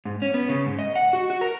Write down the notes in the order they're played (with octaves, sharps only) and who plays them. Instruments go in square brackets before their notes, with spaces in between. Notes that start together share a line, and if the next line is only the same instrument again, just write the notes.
[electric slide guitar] G#2
C#4
B3
C#3
G#2
D#5
F#5
F#4
F#4
A#4